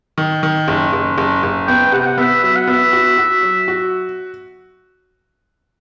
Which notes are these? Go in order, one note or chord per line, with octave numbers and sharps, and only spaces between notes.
D#3
D#3
F#1
F#1
F#1
F#1
B3 G5
C3 F#5
G5
F#5
B3 E5
F#3 E5
F#5
B3 E5
F#4
F#4
F#3
F#4